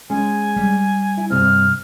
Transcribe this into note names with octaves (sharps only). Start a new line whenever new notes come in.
G#3 C#4 G#5
G3
E4
G2 C3 C4 F6